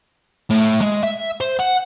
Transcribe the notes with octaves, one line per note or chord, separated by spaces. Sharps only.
A2
G#3
E5
C5
F#5